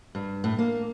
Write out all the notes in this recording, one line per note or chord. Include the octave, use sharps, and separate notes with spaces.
G2
A2
A#3